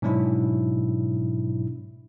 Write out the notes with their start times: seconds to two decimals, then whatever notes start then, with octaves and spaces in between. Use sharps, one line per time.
0.02 G#2 B2 F#3 D4 E4